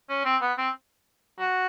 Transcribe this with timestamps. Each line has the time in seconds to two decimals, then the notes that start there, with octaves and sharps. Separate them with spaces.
0.09 C#4
0.25 C4
0.41 B3
0.58 C4
1.39 F#4